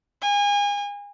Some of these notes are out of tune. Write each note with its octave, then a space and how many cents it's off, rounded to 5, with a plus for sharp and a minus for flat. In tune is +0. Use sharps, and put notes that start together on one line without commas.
G#5 -30